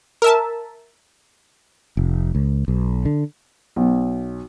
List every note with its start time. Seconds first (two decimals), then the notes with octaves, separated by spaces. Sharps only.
0.22 A#4 E5 A5
1.97 F1
2.35 C#2
2.68 B1
3.05 D3
3.76 B1